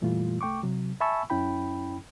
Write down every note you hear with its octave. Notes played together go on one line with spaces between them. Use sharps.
F2 A#2 E3 G3 A3 F4
C2 A3 G5 C#6 D6
C3 F#3
E5 G#5 A5 B5 C#6 E6
F#2 C#4 E4 G5 B5